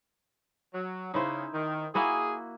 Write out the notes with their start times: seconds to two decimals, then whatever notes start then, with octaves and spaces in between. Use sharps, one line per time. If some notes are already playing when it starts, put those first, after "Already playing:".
0.74 F#3
1.14 C#3 D#4 E4 C5
1.54 D#3
1.95 A#3 E4 F#4 G#4